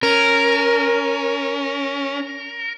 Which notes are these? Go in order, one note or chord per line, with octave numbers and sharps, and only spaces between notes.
C#4 A#4